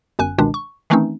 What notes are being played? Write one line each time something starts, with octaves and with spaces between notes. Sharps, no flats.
G1 F#2 G#5 F#6
G1 C#2 B2 D#3 G#3 D4
C#6
D#3 E3 A3 C4 C#4 D#4